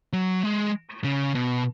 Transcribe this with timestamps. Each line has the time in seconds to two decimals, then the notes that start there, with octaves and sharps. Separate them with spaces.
0.13 F#3
0.43 G#3
1.04 C#3
1.35 B2